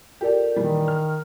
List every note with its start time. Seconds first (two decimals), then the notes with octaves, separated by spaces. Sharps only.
0.21 F4 G4 A4 A#4 D5
0.56 A#2 D#3 E3 G3
0.88 F6